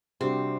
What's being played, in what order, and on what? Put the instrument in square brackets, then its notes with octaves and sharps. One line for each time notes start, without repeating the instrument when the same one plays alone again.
[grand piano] C3 G3 D4 F#4 [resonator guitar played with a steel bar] C4